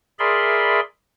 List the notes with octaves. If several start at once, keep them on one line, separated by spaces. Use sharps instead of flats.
G#4 A#4 D5 E5 B5 C6